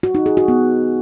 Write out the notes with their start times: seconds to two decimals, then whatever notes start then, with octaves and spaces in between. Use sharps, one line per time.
0.03 F#4
0.15 D#4
0.26 G#4
0.37 F#4
0.48 B3